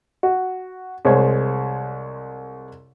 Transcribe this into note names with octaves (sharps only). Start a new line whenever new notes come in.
F#4
C2 G#3 C5 C#5